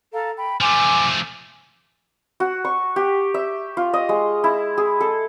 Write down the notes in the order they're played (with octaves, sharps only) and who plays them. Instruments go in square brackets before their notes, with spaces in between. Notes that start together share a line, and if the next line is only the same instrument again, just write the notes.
[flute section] A4 F5 A#5
G5 B5
[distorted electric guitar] F3 A3 [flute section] G#5 C6 D6
[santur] F#4
C#6
G4
E5
F4
D#5
G#3
E4
G#4
A4